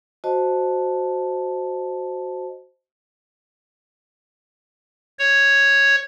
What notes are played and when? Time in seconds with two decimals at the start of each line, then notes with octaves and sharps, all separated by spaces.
0.24 F#4 C5 D#5 A5
5.19 C#5